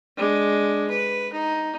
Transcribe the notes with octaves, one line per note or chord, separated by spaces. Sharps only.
G#3 D4
B4
D#4